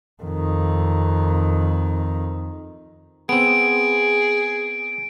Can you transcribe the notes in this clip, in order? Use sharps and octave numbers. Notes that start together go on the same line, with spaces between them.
F2 D#3
B3 C4 G#4 D7